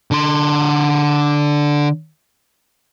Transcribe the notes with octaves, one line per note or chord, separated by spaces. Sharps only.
D3 C6